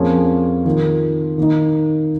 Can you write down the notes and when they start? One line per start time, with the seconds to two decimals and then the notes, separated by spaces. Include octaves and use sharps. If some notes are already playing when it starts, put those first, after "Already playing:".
Already playing: F2 F3 A#3 C#4 G#4
0.65 D#3 A#3 F4
1.38 D#3 A#3 D#4